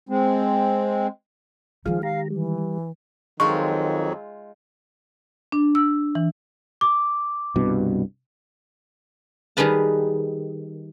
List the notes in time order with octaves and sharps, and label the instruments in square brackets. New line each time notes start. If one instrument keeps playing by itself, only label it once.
[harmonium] G#3 C4
[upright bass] D#3 G#3 [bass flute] F3 [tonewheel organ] F4 G#4 F5
[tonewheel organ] G4 A#5 [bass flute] F5
[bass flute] E3 [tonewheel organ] G3
[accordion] F2 F#3 [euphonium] D#3 [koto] G#3 D#4 F4 [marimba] C#6
[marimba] D4
E6
E3
[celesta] D6
[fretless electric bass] C2 G2 B2
[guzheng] D#3 G3 G#4 B4 A5